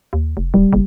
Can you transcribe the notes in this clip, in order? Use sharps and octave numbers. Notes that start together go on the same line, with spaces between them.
D#2
F1
D1 G3
F#1